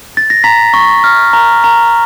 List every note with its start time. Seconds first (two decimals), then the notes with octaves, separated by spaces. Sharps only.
0.17 A6
0.30 A#6
0.44 A#5 B6
0.74 C#6
1.04 F6
1.33 A#5
1.64 A#5